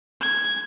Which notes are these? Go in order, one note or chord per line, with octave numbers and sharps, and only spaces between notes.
G#6